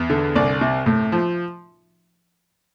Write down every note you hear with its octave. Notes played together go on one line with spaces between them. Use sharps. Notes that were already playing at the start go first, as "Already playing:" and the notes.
Already playing: E2
D3
C2 D5
C3
A2
F3